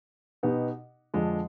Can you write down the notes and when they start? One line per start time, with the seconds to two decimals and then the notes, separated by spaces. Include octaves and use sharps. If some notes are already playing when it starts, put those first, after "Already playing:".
0.43 B2 B3 D#4 G4
1.14 F2 D3 F3 G#3 D4